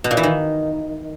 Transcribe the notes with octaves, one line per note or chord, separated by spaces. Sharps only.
B2
A#2
E3
D#3